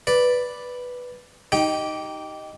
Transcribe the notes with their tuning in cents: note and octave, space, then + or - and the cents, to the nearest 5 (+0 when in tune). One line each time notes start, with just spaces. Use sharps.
B4 +0 D5 +0
D#4 +0 G4 -20 G5 +0